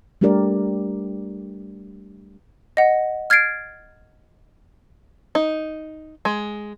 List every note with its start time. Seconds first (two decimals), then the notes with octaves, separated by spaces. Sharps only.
0.21 G3 A3 D4 G4 A#4 D5
2.77 D#5 F#5
3.30 F6 G#6 A6 C7 D7
5.35 D#4
6.25 G#3